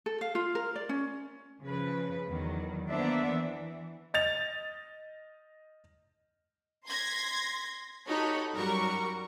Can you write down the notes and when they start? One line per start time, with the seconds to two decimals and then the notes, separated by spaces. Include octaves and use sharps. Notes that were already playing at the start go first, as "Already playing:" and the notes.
0.06 A4
0.21 F5
0.35 F4
0.55 A#4
0.76 D5
0.89 C#4
1.62 C#3 F3 B4
2.28 E2 D#3 F#3
2.89 A#3 B3 D4 C5 D5 E5
3.29 E3
4.14 D#5 A6 F7
6.85 C6 G#6 A#6 B6
8.07 D#4 F#4 G4 A4 C#5 B5
8.54 F#2 G3 F#4 A#4 C#6